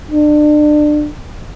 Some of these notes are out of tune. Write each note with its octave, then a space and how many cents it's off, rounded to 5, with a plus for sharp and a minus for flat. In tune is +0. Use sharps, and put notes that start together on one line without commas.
D4 +30